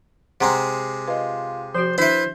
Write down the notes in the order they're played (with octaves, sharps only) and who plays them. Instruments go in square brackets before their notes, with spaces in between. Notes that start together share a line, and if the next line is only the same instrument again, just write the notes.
[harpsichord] C3 G#3 C4 [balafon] F#5 A#5 C6
[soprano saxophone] F4 [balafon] B4 D#5
[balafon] F3 F#4 [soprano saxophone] C5
[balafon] D4 E5 [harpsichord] E4 B4 [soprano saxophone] C5